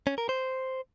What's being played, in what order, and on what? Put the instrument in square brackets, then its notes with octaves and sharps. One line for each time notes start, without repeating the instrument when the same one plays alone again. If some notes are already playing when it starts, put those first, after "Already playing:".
[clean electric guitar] C#4
A#4
C5